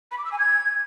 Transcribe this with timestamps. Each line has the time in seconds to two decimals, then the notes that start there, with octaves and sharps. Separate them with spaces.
0.11 B5
0.18 D6
0.25 E6
0.32 G#5
0.38 G#6